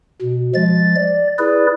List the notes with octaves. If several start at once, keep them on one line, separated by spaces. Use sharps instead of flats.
B2
F3 G#3 A6
D5
E4 G#4 B4 D5